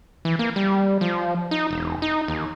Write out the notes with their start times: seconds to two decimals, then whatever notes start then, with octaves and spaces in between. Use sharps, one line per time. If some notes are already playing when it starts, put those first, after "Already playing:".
0.25 E3
0.39 A#3
0.56 G3
1.01 F3
1.51 D#4
1.71 E1
2.02 D#4
2.28 D#2